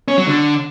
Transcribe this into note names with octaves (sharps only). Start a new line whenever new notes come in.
C#4
F#3
D3